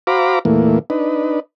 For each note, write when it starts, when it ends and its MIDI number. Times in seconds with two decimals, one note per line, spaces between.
0.07 0.39 66
0.07 0.39 72
0.07 0.39 77
0.07 0.39 82
0.07 0.39 83
0.07 0.39 86
0.45 0.79 40
0.45 0.79 46
0.45 0.79 52
0.45 0.79 57
0.45 0.79 58
0.90 1.40 62
0.90 1.40 63
0.90 1.40 71